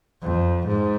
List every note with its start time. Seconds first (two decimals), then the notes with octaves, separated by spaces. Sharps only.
0.22 F2
0.67 G#2